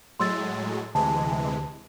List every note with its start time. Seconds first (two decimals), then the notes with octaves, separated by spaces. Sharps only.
0.20 A2 F#3 G#3 C6 E6 A6
0.95 D2 C3 E3 G#3 A5